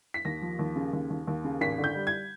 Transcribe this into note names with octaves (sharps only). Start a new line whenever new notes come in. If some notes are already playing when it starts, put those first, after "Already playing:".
B6
D#2 A#6
F3
D#2
C#3
D#2
D#2
D#2
C#3
G#1 B6
D3
G6
G3
G#6